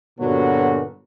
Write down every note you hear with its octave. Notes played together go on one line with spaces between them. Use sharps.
G2 A#2 D3 F#3 B3 F#4